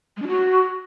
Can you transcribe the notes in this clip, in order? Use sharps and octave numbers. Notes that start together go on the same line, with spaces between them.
G#3
D4
F#4